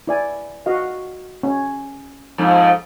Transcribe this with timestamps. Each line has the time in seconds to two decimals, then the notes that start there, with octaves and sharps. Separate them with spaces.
0.07 E4 D5 G#5
0.66 F#4 D#5 F5
1.43 C#4
2.38 F2 G#2